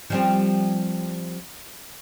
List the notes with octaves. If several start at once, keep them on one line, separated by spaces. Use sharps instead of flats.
F3 G3 C4